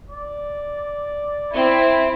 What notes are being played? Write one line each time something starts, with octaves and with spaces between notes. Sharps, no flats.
D5
C4 E4